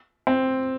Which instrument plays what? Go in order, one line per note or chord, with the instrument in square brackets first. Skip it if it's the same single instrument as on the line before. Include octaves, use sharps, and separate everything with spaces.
[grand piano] C4